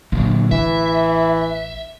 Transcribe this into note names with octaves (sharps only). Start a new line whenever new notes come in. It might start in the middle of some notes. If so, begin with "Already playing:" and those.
A#2 D3 F#3
A1 E3 E5